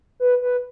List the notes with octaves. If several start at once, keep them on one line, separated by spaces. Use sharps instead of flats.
B4
B4